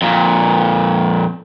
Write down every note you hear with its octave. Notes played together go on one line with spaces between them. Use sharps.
F2 A#2